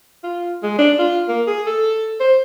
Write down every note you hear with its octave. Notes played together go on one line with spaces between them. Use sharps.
F4
G#3
D4
F4
A#3
G#4
A4
C5